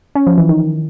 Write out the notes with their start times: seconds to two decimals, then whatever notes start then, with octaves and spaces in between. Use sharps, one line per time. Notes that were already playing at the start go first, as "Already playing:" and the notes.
0.15 C#4
0.27 F3
0.38 E3
0.49 D#3